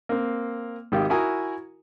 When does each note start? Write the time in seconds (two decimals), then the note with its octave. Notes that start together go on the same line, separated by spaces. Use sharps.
0.09 A#3 C4
0.92 G#1 D#3 G4 F5
1.10 E4 F#4 A#4 G#5 A#5 D#6